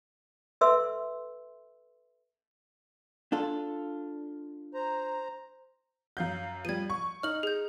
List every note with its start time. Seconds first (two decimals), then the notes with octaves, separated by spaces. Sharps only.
0.61 A4 B4 E5 C6 E6
3.32 D4 F4 A4
4.74 C5 A#5
6.17 F#2 F5 G6
6.65 F3 G3 G#6 D#7
6.90 C#6
7.23 D#4 F6 F#7
7.43 G#4 G6